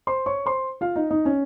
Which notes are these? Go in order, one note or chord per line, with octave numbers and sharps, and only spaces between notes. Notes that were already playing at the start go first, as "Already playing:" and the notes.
C5 C6
C#5 C#6
C5 C6
F4 F5
D#4 D#5
D#4 D#5
C#4 C#5